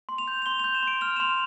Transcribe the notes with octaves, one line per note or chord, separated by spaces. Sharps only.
C6
F7
G6
F7
C6 G7
G6 F7
E7
C6 D7
F6 F7
E7
C6 F7